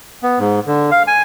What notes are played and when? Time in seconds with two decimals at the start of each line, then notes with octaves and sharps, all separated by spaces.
0.23 B3
0.39 G#2
0.67 D3
0.91 F5
1.07 G#5